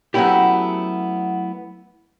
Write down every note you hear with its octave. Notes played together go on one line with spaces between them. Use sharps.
F#3 A3 B3 C#4 E4 G4